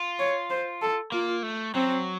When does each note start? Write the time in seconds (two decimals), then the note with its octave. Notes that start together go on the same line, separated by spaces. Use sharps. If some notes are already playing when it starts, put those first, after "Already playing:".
Already playing: F4
0.19 C#5
0.50 C5
0.82 A4
1.12 A#3 F4
1.43 A3
1.74 F#3 C4